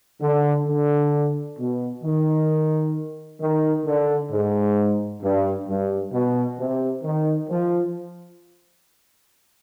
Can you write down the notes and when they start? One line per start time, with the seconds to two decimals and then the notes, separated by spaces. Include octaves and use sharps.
0.22 D3
0.68 D3
1.59 B2
2.04 D#3
3.40 D#3
3.86 D3
4.31 G#2
5.22 G2
5.68 G2
6.13 B2
6.59 C3
7.04 D#3
7.50 F3